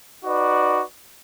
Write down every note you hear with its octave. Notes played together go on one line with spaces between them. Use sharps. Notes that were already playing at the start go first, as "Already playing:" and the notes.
D#4 F#4 B4 D5